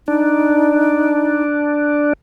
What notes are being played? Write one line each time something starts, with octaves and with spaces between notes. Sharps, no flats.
D4 D#4